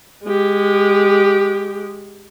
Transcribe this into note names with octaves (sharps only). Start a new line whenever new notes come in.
G#3 G4